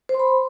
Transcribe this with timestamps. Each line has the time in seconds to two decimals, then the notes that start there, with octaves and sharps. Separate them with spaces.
0.09 C5
0.14 C6
0.19 B5